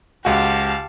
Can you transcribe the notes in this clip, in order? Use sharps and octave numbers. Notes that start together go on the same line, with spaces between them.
C#2 F#4 G4 F5 A5